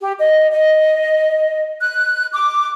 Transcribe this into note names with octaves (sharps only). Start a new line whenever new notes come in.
G4
D#5
D#5
F#6
D6